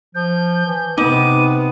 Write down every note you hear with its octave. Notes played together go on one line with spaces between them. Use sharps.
F3 G6
E3
C3 B3 D#4 D6 D#7